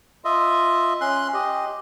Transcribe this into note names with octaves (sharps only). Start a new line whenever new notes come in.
F4 D#5 E5
C#4 C6 F#6
G4 D#5